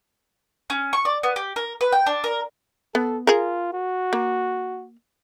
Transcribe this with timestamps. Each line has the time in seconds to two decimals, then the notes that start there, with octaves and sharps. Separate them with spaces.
0.70 C#4
0.93 C#6
1.05 D5
1.23 B3
1.36 G4
1.56 A#4
1.81 B4
1.92 G5
2.06 D4
2.24 A#4
2.95 B3 A4
3.27 F4 G#4 A#4
3.73 F#4
4.13 A#3